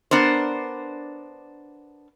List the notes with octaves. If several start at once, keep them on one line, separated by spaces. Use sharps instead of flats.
B3 D4 A#4 C5